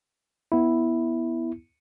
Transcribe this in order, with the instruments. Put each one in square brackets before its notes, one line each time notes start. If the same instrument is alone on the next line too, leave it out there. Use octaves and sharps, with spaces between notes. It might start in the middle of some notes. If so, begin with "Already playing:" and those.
[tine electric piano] B3 E4